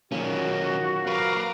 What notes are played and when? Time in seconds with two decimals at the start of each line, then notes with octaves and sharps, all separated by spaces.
0.12 A#2 D#3 F#3 A#3 C#4 F#4
1.07 A#4 B4 F5 A#5 D6